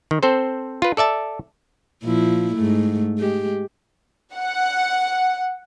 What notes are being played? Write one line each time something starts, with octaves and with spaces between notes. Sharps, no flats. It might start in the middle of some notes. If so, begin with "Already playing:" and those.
D#3
C4 A4 C5
F4 B4
A4 D5 E5 A5
A#2 F3 E4
G#2 A3
G#3 G4
F#5